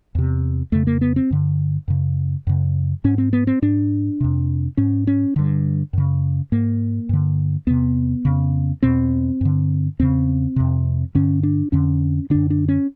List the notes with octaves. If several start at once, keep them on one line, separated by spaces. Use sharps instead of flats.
E2 C3
F2 C#3 A3
A#3
B3
C4
G2 D3
F#2 C#3
F#2 C#3
G#2 C#4
C4
B3
C4
G#2 D4
F2 C3
G#2 C#4
C#4
G2 D3
F#2 C#3
G#2 A#3
G2 D3
E2 C3 B3
F2 C#3
E2 B2 C4
G2 D3
E2 C#3 C4
F2 C3
G2 D3 C#4
D4
F2 D3 C#4
F#2 D3 D4
D4
C#4